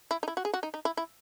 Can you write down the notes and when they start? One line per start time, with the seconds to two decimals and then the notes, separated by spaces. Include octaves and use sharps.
0.11 E4
0.23 D#4
0.28 E4
0.37 F#4
0.45 G#4
0.53 F#4
0.63 D#4
0.74 D#4
0.85 E4
0.97 E4